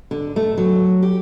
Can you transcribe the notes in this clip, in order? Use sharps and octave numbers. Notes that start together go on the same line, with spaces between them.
D3
A3
F#3
G4